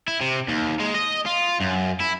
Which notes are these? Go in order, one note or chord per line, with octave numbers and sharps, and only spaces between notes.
E4
C3
D#2
G#3
D#5
F4
F#2
E4